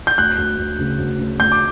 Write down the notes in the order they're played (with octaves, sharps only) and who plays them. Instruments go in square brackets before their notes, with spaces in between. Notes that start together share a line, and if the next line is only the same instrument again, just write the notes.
[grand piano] G6
[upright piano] D2 [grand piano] F#6
[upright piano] D2
D2
C#3
D2
C#3
[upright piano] D2 [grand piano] G6
[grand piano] D6